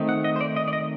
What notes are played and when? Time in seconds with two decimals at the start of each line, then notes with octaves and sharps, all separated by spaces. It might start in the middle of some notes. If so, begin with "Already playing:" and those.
Already playing: D#3 A3 C4 D#4
0.09 F#5
0.24 D#5
0.36 C5
0.41 D5
0.56 D#5
0.68 D5
0.73 D#5